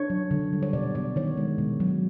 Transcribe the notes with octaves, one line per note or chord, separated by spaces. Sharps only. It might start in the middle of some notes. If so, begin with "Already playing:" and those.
Already playing: D4 C#5
F#3
D3
G3
C#5
B2 D5
B2 D5
D#3 C#5
G#3
B2
F#3